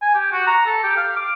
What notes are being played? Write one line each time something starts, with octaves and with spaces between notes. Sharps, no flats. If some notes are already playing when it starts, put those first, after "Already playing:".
G#5
G4
F#4
A#5
A4
G4
F5
D6